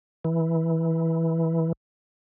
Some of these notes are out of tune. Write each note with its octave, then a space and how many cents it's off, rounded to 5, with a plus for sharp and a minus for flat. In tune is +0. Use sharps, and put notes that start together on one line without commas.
E3 -10